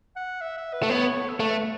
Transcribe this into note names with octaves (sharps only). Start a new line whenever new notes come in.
F#5
E5
E5
B4
A3
B3 C#5
A4
A3 B4